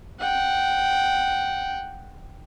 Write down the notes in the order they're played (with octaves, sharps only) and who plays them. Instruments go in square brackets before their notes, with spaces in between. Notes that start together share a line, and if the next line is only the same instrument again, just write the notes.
[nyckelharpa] F#5 G5